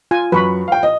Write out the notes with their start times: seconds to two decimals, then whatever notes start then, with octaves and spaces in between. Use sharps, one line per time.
0.11 F4 G#5
0.32 F#2 B4 B5 C#6
0.68 F5 G5
0.83 D#5